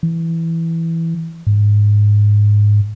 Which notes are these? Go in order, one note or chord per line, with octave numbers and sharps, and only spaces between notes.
E3
G#2